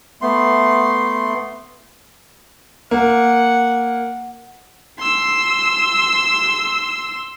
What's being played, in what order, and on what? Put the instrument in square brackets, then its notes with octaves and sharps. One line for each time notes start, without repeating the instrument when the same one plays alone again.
[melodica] A3 B3 C6
[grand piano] A#3 [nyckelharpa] F#5
[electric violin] C6 E6